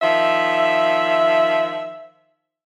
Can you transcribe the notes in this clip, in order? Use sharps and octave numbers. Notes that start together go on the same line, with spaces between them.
D#3 F3 E5